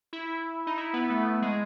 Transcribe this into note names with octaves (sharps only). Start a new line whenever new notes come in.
E4
D#4
E4
B3
A3
G#3